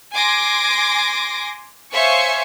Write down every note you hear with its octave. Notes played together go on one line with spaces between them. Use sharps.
G#5 C6 D6 A#6
C5 C#5 E5 F5 G#5 C#6